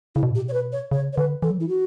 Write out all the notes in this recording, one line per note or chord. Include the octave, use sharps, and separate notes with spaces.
C#3 E4
B2
A2
B2 G4
C#5
B4
C#5
C#3 C#5
C#5
D3 B4
E3 A4
F#3
E3 E4
F#4